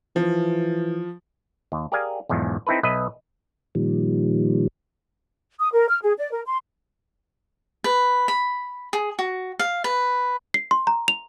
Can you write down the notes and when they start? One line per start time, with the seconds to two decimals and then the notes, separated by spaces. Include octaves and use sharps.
0.16 E3 F3
1.72 D#2
1.92 G4 G#4 A#4 D5 F5 G#5
2.29 B1 E2 G#2 F3
2.67 C4 D#4 E4 A4 B4
2.83 B1 B4 D#5 E5
3.75 A#2 D#3 F3 G3
5.60 D#6
5.73 A#4
5.89 F6
6.03 G#4
6.17 D5
6.31 A#4
6.47 C6
7.84 B4
8.28 B5
8.93 G#4
9.19 F#4
9.59 F5
9.84 B4
10.54 C7
10.71 C6
10.87 A#5
11.08 F7